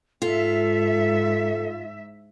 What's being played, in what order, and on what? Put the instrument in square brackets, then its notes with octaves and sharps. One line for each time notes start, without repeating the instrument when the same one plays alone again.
[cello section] G#2 E5 [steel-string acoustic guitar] F4 [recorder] A4